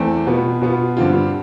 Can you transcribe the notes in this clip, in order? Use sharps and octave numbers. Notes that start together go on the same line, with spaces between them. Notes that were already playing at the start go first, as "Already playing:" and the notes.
Already playing: E2 A3 C4
B2 B3 F4
B2 B3 F4
G2 D3 G3 C4 F4